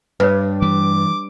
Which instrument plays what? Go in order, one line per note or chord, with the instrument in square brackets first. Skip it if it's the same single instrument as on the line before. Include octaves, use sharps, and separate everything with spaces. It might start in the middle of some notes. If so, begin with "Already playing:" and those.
[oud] G2 [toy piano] B4 C#5
[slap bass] E3 G3 [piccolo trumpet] D6